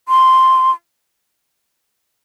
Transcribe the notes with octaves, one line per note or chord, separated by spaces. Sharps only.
C6